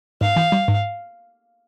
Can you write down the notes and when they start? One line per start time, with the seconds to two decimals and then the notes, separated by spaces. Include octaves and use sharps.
0.21 G#2 F5
0.36 E3
0.52 G3
0.68 G#2